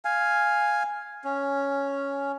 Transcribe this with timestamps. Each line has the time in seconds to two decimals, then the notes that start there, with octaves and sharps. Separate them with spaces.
0.05 F5 G#5
1.24 C#4